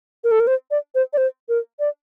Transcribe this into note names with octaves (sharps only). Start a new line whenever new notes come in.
A#4
A4
A#4
C5
D5
C5
D5
C5
A#4
D5